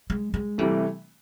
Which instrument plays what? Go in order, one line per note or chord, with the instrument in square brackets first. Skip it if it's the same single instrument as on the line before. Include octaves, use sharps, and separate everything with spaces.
[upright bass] G#3
G#3
[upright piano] C3 E3 A3 [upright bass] G3